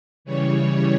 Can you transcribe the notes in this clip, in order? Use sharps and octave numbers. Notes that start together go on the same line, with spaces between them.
C#3 E3 G3 C#5